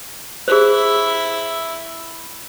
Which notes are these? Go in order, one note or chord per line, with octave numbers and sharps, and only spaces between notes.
E4 G#4 C5 E5